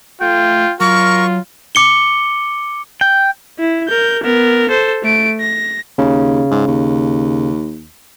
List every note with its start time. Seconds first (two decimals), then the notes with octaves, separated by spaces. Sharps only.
0.21 A3 F4 G5
0.80 F#3 F4 A#4 C#6
1.75 D6 C#7 G7
3.01 G5
3.59 E4
3.88 A#4 G6
4.23 B3 A#4
4.69 A4 C5
5.03 A3 D7
5.40 A#6
5.98 D#2 C#3
6.51 G#2
6.67 D#2